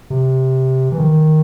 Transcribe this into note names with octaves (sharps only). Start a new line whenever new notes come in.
C3
E3
D#3